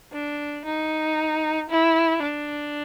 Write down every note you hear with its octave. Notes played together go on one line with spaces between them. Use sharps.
D4
D#4
E4
D4